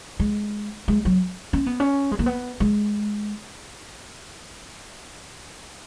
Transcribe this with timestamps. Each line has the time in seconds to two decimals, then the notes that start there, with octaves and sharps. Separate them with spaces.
0.20 G#3
0.88 G#3
1.05 F#3
1.53 C#4
1.66 B3
1.80 C#4
2.11 G#3
2.19 A#3
2.26 B3
2.60 G#3